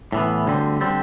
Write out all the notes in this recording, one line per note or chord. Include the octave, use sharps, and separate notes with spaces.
A2 E3 B3
D2 D3 G3 C4
D3 G3 C4